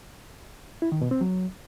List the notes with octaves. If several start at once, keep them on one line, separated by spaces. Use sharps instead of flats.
E4
D#3
B2
C4
F#3